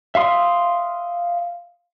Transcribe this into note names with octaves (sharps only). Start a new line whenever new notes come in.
E5 F5 C6 D#6